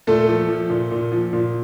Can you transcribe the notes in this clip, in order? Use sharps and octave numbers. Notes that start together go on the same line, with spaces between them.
A#2 A3 A4
F3
F3
A#2
A#2
F3
A#2